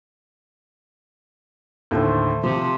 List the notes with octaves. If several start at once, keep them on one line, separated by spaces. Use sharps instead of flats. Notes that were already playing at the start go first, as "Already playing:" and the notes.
D#2 A2 D3 A3 A4 C5
C3 F3 C6